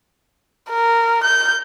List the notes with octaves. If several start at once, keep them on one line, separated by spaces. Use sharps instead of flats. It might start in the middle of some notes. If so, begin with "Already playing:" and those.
A#4
G6